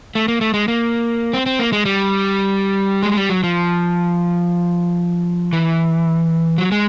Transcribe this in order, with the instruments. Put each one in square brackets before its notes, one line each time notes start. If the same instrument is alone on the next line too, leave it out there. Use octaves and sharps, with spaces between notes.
[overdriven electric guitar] A3
A#3
A3
G#3
A#3
C4
C4
A#3
G#3
G3
G#3
G3
F#3
F3
E3
F#3
G#3